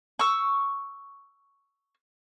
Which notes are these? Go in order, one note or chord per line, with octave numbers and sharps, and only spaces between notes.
C#6 E6